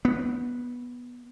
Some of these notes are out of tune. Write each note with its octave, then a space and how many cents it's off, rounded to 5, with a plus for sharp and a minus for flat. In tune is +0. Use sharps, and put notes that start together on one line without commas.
B3 -10